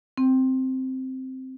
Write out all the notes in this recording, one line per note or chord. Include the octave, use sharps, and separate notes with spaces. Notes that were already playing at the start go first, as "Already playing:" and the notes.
C4